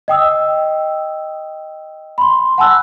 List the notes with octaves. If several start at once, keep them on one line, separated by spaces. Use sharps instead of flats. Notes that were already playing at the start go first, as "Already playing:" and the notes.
D#5 G5 D#6 E6
B5 C6
F#5 G#5 A5 E6 F#6